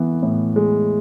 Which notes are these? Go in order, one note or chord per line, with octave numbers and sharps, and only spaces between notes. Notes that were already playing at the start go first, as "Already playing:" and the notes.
Already playing: E3 B3
A2
G#3